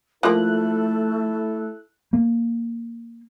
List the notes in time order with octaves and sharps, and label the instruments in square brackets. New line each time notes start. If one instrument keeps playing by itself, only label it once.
[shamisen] F3 A#3 [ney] A3 [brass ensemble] E4 A4 [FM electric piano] F#6
[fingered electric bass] A#3